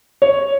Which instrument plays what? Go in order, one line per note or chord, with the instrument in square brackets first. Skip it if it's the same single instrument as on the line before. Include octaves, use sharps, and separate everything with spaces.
[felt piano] C#5